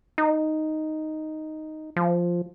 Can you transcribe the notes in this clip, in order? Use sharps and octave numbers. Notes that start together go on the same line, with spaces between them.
D#4
F3